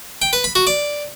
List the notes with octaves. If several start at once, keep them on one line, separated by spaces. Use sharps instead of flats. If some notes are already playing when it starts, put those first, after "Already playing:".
G5
B4
B5
F#4
D5